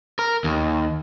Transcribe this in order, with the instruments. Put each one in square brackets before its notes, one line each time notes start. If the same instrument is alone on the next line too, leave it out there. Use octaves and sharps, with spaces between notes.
[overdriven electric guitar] A#4
D#2